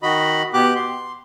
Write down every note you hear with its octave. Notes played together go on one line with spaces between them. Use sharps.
D#3 F#4 D#5 B5
B2 B3 G4 D6 F#6
C6